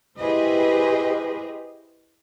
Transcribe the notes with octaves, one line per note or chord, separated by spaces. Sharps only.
E4 G4 G#4 B4 C5 D#5